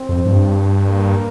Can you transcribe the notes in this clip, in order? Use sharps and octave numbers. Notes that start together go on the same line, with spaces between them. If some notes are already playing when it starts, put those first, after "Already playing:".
Already playing: C4
F2
G2
A#3